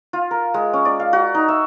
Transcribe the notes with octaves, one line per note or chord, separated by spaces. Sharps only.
F4
A#4
G#3
C#4
D5
F5
F#4
D#4
E5